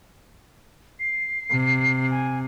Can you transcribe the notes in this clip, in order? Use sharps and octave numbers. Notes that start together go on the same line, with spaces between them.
C7
C3
G#5